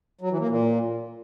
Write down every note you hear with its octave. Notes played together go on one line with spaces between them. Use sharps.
F#3
E3
A#3
A#2